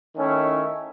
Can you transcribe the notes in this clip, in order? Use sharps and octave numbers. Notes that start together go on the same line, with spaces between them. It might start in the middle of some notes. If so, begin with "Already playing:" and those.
D#3 A3 C#4 E4